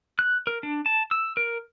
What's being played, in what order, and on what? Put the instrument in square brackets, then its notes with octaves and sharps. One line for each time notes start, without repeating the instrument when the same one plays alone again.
[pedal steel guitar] F#6
A#4
D4
A5
E6
A#4